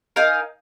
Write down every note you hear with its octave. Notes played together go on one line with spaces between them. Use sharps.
D#4 A#4 F5 G#5